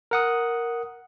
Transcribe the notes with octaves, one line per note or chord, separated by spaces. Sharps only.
A#4 F#5 D#6